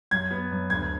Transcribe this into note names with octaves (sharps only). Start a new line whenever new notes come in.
F#2 G#6
B3
F#2
D2 G#6